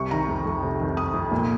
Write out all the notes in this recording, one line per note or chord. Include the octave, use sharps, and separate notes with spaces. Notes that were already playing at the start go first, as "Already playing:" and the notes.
Already playing: C2 C3 C#6
D#3 A#5
F2
F2
C3
D#3
F2 D#6
F2
A#2